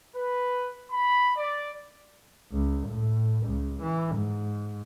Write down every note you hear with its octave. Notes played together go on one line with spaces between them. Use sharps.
B4
B5
D5
C#2
A2
C#2
E3
G#2